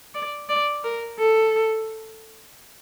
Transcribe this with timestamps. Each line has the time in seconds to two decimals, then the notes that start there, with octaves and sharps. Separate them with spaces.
0.15 D5
0.49 D5
0.84 A#4
1.19 A4